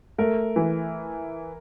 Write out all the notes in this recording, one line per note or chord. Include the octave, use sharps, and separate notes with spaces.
A3 A#4
E3